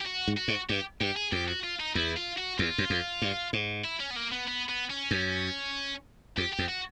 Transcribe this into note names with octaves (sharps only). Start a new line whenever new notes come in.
G4
F#4
G#2
F#4
G#2
G2 G4
G2 G4
G#4
F2 G4
F#4
F4
D#4
E2 E4
F4
F#4
E2 F4
F#2
F2
G2
G#2
E4
C#4
B3
A#3
B3
B3
B3
C#4
F#2
F2 G4
G4
F2
F#4